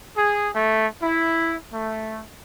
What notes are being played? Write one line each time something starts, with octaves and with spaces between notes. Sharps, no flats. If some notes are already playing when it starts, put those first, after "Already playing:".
G#4
A3
E4
A3